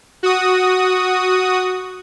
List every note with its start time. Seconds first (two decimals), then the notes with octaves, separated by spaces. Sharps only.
0.23 F#4 D#6